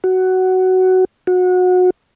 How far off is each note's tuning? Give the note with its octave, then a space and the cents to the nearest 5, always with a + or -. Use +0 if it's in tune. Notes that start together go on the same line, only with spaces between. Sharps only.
F#4 +10
F#4 -25